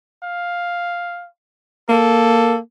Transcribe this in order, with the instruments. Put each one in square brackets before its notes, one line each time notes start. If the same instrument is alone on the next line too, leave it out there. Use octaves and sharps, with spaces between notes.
[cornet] F5
[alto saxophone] A#3 [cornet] A4